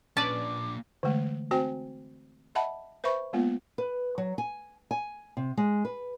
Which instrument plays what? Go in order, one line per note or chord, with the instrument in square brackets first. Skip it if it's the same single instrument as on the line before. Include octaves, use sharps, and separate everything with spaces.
[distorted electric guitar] A#2 D4 [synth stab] C#4 B4 D5 [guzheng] A5 [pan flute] D6
[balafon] D3 E3 G#3 A3
A3 C4 F#4 C5 G5 G#5
D#5 E5 F#5 A5 B5
B4 C5 E5 B5 C#6
G#3 A#3 B3 F4
[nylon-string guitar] B4
F#3
G#5
G#5
C3
G#3
B4